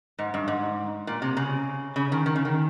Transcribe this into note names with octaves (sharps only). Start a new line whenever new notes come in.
G#2
G2
G#2
A#2
C3
C#3
C#3
D#3
D#3
C#3
D#3